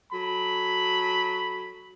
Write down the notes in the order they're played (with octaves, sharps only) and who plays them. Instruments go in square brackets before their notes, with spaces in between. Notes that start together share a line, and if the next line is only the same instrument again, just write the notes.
[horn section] F#3 A4 B5